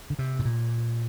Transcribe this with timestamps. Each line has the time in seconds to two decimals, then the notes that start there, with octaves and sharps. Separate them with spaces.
0.10 D3
0.19 C3
0.39 A2
0.45 A#2